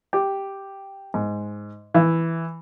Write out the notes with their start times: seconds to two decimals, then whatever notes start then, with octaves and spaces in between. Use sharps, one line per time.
0.13 G4
1.14 G#2
1.94 E3